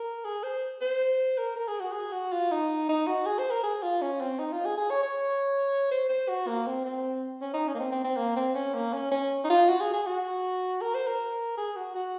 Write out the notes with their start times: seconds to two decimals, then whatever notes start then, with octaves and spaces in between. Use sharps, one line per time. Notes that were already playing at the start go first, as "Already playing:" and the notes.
Already playing: A#4
0.25 G#4
0.43 C5
0.81 C5
1.38 A#4
1.56 A#4
1.68 G#4
1.81 F#4
1.92 G#4
2.13 F#4
2.32 F4
2.51 D#4
2.89 D#4
3.07 F#4
3.26 G#4
3.39 C5
3.51 A#4
3.64 G#4
3.83 F4
4.01 C#4
4.21 C4
4.39 D#4
4.52 F4
4.66 G#4
4.77 G#4
4.90 C#5
5.03 C#5
5.91 C5
6.09 C5
6.29 F#4
6.47 A#3
6.67 C4
6.85 C4
7.42 C#4
7.54 D#4
7.68 C#4
7.74 A#3
7.80 C4
7.92 C4
8.04 C4
8.17 A#3
8.37 C4
8.55 C#4
8.74 A#3
8.94 C#4
9.12 C#4
9.45 D#4
9.50 F4
9.69 F#4
9.81 G#4
9.93 G#4
10.07 F#4
10.81 A#4
10.94 C5
11.07 A#4
11.58 G#4
11.76 F#4
11.95 F#4